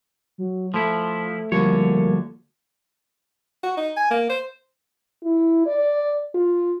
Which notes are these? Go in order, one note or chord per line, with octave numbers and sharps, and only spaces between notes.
F#3
F3 A3 E4
D2 D3 F3 G3 A#3 C#5
F#4
D#4
G#5
A#3
C5
E4
D5
F4